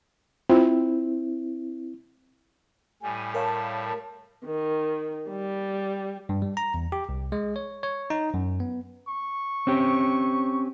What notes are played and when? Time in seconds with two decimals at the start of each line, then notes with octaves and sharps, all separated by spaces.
0.50 C4 E4 F4
3.03 A2 G3 G#5
3.34 A#4 C#5 F5 A5
4.45 D#3
5.29 G3
6.29 G2
6.42 G3
6.57 A#5
6.74 E2
6.92 G4
7.09 C2
7.32 G#3
7.56 C#5
7.83 C#5
8.10 D#4
8.34 F#2
8.60 B3
9.08 C#6
9.67 C4 C#4 G4